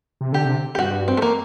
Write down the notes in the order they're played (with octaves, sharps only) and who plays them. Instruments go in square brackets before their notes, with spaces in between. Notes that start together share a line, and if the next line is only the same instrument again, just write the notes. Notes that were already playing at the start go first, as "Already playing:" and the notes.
[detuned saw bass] C3
[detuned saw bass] D3 [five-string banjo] G4
[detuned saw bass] C3
[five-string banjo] G4
[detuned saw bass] G2 [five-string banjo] F#4
[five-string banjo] C4
A3
A#3